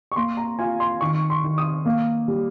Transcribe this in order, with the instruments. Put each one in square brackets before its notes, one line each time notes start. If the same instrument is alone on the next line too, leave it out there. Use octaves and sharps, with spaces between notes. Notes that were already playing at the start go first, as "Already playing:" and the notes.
[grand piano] C#6
A#3 C6
A#5
F4 G#5
C6
D#3 C#6
C6
D#3
D#6
A#3
G3